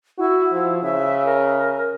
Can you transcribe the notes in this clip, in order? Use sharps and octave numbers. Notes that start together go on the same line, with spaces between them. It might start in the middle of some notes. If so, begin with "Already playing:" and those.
E4 F#4
F3
C#3 E5
A#4